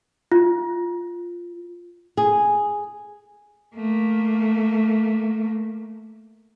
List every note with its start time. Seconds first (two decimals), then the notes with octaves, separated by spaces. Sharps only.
0.32 F4
2.17 G#4
3.76 A3 A#3